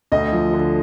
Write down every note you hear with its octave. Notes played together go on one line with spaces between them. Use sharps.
D2 D#5
F3
D3